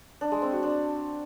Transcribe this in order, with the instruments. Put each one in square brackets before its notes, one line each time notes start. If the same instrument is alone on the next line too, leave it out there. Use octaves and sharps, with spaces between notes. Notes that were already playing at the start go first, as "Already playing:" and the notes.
[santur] D4
G#3
C4
F#4
D4